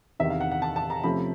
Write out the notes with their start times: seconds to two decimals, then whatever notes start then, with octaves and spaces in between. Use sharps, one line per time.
0.20 E2 C3 D#3 E5
0.30 F5
0.41 F#5
0.52 F#5
0.62 A5
0.76 A5
0.90 A#5
1.03 C3 F3 A3 C#4 B5